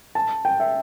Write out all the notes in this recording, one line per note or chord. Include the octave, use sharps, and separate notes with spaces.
A5
G5
E5